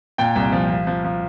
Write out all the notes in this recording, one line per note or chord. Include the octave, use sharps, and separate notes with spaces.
A#2 G5
C2
F3
F3
F3
F3